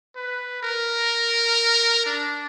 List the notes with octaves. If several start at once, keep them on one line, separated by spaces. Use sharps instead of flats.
B4
A#4
D4